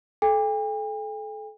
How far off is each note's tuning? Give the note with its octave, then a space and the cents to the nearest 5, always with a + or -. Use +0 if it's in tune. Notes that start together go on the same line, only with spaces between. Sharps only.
A4 -30 G5 +45